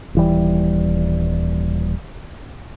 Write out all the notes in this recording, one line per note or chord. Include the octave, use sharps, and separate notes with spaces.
D#1 E3 G3